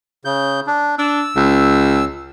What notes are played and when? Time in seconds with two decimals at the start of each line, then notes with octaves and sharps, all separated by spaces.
0.25 C#3 G6
0.67 D4
0.99 D4 E6
1.36 C#2